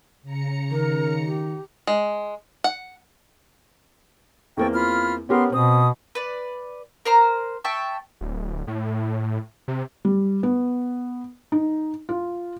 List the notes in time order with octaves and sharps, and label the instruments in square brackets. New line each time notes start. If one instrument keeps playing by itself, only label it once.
[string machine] C#3 A#5 C#7
[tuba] D#3 [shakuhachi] A#4
[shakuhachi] G4
[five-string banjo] G#3
F#5
[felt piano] E2 A#3 C4 [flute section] A4 G5 C#6
[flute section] F4 B5 F6
[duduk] B3 [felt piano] C#4 G4 A#4 [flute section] C6
[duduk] B2 [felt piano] C4 [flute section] D#6
[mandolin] B4 D5
A#4 C5 A#5
E5 G5 A5 C#6
[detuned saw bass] D1
A2
C3
[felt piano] G3
B3
D#4
F4